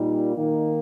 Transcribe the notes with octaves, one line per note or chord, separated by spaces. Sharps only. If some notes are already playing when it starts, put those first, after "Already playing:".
Already playing: A#2 G3 D#4
D#3 A#3 D#4